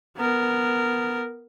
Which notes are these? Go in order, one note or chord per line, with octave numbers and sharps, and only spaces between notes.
B3 A#4